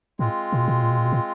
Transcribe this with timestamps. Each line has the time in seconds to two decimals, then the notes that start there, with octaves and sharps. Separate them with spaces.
0.19 A2 G#3 C4 F4
0.53 A#2
0.61 B2
0.68 A#2
0.76 B2
0.83 A#2
0.90 B2
0.98 A#2
1.05 B2
1.12 A#2